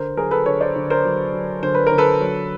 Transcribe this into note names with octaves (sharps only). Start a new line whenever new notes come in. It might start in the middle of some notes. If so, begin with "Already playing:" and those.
Already playing: D3 A#4 C5
F#3 G#4 A#4
A4 B4
D3 B4 C#5
C5 D5
D3
A#4 C5
F#3
F#3
D3 C5
B4
A#4
D3
A4 B4
F#3